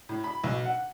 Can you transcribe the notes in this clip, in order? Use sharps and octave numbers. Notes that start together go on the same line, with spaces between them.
A2
B5
B1
F#5